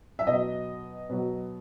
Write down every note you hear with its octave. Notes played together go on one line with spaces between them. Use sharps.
E5
B2 F#3 D#5
B2 F#3